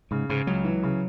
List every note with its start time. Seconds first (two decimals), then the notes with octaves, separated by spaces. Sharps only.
0.11 G#2 C#3
0.29 G#2 C#3
0.47 C#2 F#3
0.64 E3
0.83 C#3